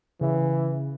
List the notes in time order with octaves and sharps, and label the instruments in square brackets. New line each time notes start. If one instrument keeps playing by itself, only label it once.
[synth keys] C#3 [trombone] E3